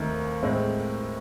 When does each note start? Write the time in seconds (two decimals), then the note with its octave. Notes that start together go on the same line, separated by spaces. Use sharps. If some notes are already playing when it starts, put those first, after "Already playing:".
Already playing: D#2 D#3 A3 C4
0.43 A2 G#3 C4